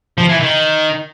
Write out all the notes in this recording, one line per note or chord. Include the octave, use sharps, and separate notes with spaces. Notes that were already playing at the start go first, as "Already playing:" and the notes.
F3
E3
D#3